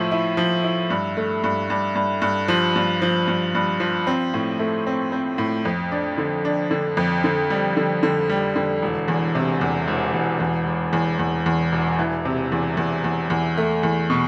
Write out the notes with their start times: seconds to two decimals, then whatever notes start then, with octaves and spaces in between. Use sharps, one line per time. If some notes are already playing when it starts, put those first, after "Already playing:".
Already playing: A2 F3 E4
0.11 E4
0.37 F3
0.64 E4
0.90 G2
1.17 A3
1.44 G2
1.70 G2
1.95 G2
2.22 G2
2.48 F3
2.76 G2
3.02 F3
3.28 G2
3.55 G2
3.80 F3
4.07 C4
4.34 A2
4.59 A3
4.87 C4
5.12 C4
5.38 A2
5.65 F2
5.92 D4
6.18 D3
6.45 D4
6.71 D3
6.97 F2
7.24 D3
7.50 G3
7.77 D3
8.03 D3
8.29 G3
8.56 D3
8.82 E1
9.08 E2
9.35 C3
9.61 E2
9.88 E1
10.14 E1
10.40 E2
10.66 E1
10.93 E2
11.19 E2
11.46 E2
11.72 E1
11.99 E3
12.25 C3
12.52 E2
12.77 E2
13.04 E2
13.30 E2
13.57 A3
13.83 E2
14.10 B2